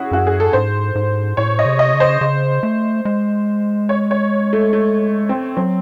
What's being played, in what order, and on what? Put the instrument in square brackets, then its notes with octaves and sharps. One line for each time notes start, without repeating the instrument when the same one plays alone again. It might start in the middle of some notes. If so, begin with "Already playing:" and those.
Already playing: [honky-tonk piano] C#4 E4 F#4 G#4
[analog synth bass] F#2 [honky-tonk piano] F#4
[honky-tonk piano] G#4
A4
[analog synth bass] G#2 [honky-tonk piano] C5
[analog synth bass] G#2
[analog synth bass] A2 [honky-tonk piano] C#5
[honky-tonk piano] D#5
[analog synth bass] C3
[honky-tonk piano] D#5
[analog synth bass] C#3
[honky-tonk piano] C5
[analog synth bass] C#3
A3
G#3
[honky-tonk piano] C#5
C#5
A3
A3
C4
[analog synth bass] F#3 [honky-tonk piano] C4